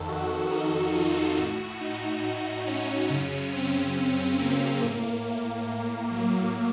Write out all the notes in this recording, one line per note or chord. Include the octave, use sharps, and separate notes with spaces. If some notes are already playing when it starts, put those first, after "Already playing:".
Already playing: F2 D#3 A4
F#4
D#4
F4
A2 F#4
D#4
C#4
F#2 C#3 C#4
C4
A#3
A2 A#3
F#3